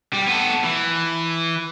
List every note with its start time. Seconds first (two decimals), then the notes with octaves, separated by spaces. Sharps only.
0.13 G3
0.27 B3 A4
0.64 E3